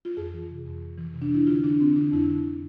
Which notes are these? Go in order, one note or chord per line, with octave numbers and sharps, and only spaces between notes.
F4
F2 G#4
E3
C3
F2
F2
E3
C3
D4
E3 E4
D3 F4
D3 D4
D3 C4
D3 D4
F2 E4
D3